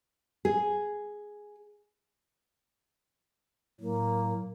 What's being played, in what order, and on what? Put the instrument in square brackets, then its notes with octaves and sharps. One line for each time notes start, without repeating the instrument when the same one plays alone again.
[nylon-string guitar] G#4
[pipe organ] A2 F#3 [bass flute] A#3